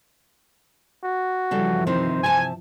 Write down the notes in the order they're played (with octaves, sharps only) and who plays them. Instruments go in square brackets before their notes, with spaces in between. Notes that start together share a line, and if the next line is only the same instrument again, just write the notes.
[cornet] F#4
[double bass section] G2 E3 F3 [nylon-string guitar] C#3 G3 A4
[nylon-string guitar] C3 D#3 C4 [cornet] C5
[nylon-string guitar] C3 A5 [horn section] G#5